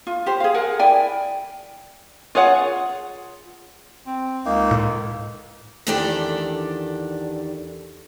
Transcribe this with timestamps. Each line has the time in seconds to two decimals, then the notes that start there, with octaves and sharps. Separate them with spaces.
0.07 F4
0.26 G4 C5
0.40 G#4 F5
0.54 A#4 F#5 G#5
0.79 E4 D5 G5 G#5
2.35 F4 G#4 C#5 F#5
4.06 C4
4.46 C#2 A#3 D#4
4.71 A2
5.87 E2 D#3 D4 G4 A4 D5